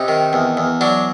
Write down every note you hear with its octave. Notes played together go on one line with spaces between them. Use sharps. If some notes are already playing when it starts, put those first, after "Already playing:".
Already playing: C3 D#4
D#3
E2
E2
F#3 D4